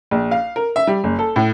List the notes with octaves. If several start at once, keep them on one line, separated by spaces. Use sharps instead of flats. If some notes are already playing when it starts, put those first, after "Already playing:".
A#1
F5
A#4
E5
G3
F#1
A4
A2